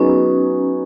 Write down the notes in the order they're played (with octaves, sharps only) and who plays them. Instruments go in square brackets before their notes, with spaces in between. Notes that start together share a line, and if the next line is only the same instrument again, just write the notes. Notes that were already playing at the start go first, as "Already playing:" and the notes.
Already playing: [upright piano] F#3 B3 D#4 G#4 [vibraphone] C#4